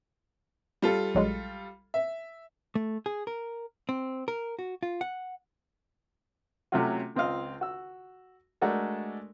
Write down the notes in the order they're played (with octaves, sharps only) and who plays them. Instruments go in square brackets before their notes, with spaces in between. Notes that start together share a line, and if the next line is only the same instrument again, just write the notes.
[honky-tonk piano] G3 F4 A4
[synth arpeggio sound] A#1 F#3 G#3
[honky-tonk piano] E5
[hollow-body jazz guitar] A3
G#4
A#4
C4
A#4
F#4
F4
F#5
[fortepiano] C3 F#3 A3 C#4 F4 F#4
C#2 C4 F4 D#5 F5
F#4 E6
G#3 A3 D4 F#4 A4 A#4